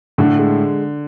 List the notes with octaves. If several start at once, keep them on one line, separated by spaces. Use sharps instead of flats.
A2 D3
G#3